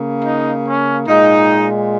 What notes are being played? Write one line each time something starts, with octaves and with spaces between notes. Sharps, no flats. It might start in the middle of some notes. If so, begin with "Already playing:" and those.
Already playing: C#3 A#3
D#4
C#4
A#2 G#3 D#4